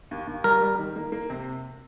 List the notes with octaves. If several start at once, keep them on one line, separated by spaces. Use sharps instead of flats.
D#2
D#2
G3 A#4
G3
D#3
A#3
A#3
C3